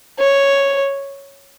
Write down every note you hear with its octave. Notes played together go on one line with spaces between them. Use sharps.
C#5